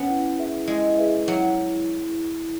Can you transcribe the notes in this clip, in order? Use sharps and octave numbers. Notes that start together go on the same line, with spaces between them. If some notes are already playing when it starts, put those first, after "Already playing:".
Already playing: B3 C#4
E4
G#4 B4 E5
G#3 E4
G#4 B4 E5
F#3 E4